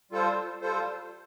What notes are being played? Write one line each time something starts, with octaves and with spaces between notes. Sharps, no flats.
G3 F4 A4 C5
G3 F4 A4 C5